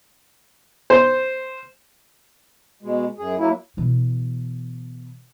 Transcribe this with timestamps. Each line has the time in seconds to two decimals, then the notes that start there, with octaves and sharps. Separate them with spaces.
0.90 C5
2.83 B2 G#3
3.18 F#2 G#4
3.38 F#3 A#3 E4
3.77 B2 E3